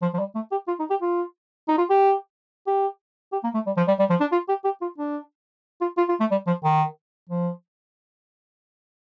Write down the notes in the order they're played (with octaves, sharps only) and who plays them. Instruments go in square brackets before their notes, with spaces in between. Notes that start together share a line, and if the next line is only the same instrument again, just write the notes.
[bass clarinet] F3
F3
G3
A3
G4
F4
D#4
G4
F4
D#4
F4
G4
G4
G4
A#3
A3
G3
F3
G3
G3
F3
D4
F4
G4
G4
F4
D4
F4
F4
F4
A3
G3
F3
D#3
F3